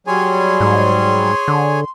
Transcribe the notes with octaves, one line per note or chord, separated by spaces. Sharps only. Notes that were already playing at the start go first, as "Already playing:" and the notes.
F#3 G3 G#4 C#5 G#5 C6
G#2
D3